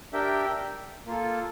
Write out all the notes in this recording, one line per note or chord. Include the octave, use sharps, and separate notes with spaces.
D4 G4 A#4 E5 G5
A#3 F4 A4